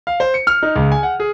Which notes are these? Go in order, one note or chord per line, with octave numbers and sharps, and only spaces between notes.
F5
C5
C#7
F6
D#4
C#2
G#5
F#5
G#4